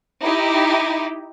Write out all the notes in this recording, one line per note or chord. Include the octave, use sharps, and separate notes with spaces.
D#4 E4 G4